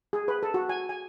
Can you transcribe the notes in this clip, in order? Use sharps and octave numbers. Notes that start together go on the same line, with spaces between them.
G#4
B4
A4
F#4
G#5
G#5